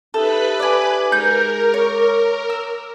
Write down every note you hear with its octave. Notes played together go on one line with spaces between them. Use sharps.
D#4 G4 A4 B4 E5 B5
D5 G#5
G#3 G#4 A#4 G6
C#5 D6
E6